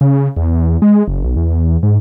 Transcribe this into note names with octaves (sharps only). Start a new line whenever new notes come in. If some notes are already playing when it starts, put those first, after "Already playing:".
C#3
E2
G#3
F#1
B1
E2
G#2